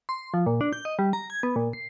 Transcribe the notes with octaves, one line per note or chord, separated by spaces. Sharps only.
C6
F3
A#2
D4
G6
D#5
G3
A#5
G#6
B3
A#2
C7